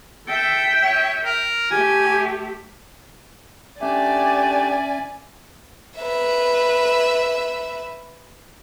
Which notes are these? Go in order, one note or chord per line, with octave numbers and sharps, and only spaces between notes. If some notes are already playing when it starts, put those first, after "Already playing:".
A4 E5 G5
C#5
A#4
A3 G4 G#5
A3 C#4 D4 G4 D5 E5 G#5
B4 E5